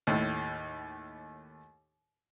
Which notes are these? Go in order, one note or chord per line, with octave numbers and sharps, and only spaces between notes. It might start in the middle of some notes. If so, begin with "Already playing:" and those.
D#2 A2